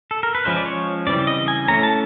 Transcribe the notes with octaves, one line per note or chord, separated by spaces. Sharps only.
A4
A#4
B4
F3 G#3 C#4 C5
D5
C#5
C#3 E3 G3 C4 D5
D#5
G#5
E3 A3 C#4 A#5
A5